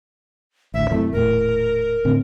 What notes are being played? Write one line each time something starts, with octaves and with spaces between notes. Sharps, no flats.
A1 D2 E5
F#2 C3 E3 A3
D#1 A2 A#4
A2 D3 C4